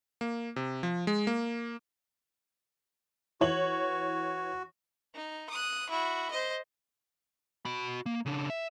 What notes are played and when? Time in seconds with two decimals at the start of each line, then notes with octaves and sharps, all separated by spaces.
0.21 A#3
0.56 C3
0.83 F3
1.07 G#3
1.27 A#3
3.41 E3 F#4 C#5 F#7
5.15 D#4
5.50 D#6 F#6
5.90 E4 F#4
6.31 C5 D#5
7.65 F#4 B5
8.06 A#3
8.26 C#3 D4
8.50 E5